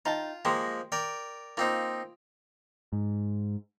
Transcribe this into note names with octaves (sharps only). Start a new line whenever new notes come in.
D#4 F4 G5 A5
F3 G#3 A#3 G4 C5 A#5
A#4 D5 G5
A#3 C4 D#4 F4 C5
G#2